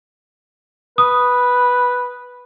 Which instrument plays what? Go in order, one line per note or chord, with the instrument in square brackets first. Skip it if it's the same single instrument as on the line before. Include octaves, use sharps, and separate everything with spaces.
[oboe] B4 [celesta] D#6